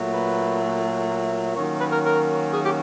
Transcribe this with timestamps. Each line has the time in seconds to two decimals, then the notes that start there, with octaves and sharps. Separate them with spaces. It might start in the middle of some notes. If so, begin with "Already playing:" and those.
Already playing: A#2 F#3 A3
0.12 B4
1.55 D#3 F#3 A#3 C#4 C#5
1.79 B4
1.92 A#4
2.04 A#4
2.52 G#4
2.64 G4